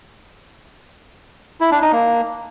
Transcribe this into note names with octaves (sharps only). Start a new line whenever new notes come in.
E4
D4
D#4
A#3